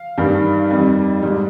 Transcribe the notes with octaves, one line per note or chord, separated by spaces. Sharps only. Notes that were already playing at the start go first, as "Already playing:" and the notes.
Already playing: F5
G2 D#3 G3
F2 D#3 G3
G#2 G3